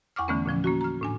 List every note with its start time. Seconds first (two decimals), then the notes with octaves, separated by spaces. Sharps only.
0.16 E2 F#5 C#6 D6 F6
0.28 D3 E3 A3 B3 C#4
0.46 A#2 D3 F3 C#4
0.64 A#3 C#4 F#4
0.81 A#5 F6
1.01 A2 D4 G#5